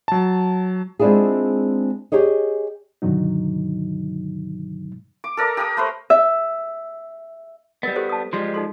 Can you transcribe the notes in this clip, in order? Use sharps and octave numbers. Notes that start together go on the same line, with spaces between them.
F#3 A5
G#3 C4 D4 E4 F4 G#4
G4 G#4 C#5 D#5
G2 B2 D3 D#3 F#3 D#4
D6
A4 A#4 D5 A#5
G4 A#4 G5 D#6
A3 B4 C5
E5
G3 B3 A#4 D#5
G4 A4 C5
A5 D#6
F3 G3 G#3 C6
D#4 A4 C6